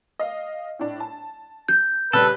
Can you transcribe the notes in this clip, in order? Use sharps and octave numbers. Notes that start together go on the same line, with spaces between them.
D#5 F5
A2 D4
A5
G6
C#3 G3 A4 B4